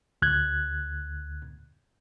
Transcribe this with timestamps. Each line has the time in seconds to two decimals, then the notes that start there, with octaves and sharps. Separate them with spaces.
0.22 D2 F#6 G#6